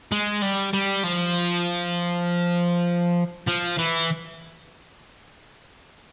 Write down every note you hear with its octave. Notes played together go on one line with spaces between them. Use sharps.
G#3
G3
G3
F3
F3
E3